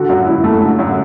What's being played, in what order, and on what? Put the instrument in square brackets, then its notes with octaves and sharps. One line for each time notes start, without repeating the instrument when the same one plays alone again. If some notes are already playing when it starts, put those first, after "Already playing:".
Already playing: [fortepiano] D3 [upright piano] F#4
[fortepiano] F#2
E4
A3
D3
F#2